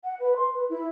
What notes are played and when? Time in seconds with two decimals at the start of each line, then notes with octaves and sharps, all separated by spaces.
0.04 F#5
0.20 B4
0.36 C6
0.54 B4
0.70 E4